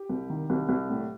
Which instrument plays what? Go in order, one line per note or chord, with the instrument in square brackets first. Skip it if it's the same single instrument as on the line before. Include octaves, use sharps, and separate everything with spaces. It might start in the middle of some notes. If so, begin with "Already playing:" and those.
Already playing: [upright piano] G4
C2
D#3
C2
C2
A2